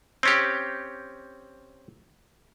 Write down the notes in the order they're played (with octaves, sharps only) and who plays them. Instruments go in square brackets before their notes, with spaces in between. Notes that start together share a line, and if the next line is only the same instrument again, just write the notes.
[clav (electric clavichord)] C4 C#4 G4